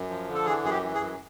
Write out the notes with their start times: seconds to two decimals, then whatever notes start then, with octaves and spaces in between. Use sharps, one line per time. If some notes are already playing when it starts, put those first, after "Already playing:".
Already playing: F#2
0.09 F3
0.28 D3
0.35 A4
0.46 E3 G#4
0.64 F#2 G#4
0.71 G4
0.83 E3
0.95 G#4
1.01 F#2